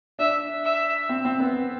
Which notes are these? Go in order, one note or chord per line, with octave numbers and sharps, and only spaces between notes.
D4 E5
E5
C4
C4
B3